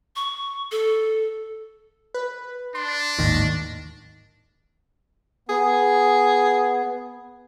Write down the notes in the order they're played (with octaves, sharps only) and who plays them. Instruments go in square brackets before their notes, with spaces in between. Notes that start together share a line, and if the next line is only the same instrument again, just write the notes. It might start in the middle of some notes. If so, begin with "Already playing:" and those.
[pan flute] C#6
A4
[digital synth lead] B4
[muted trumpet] D4 [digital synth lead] C6
[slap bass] G#1 D#2 A2 [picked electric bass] D#3 [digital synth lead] A#6
[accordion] B3 [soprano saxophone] G#4